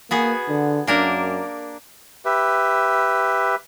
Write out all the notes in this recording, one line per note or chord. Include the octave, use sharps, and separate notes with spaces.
A#3 B3 F#4 G#4
D3
F#2 A#3 D4 A#4
G4 B4 E5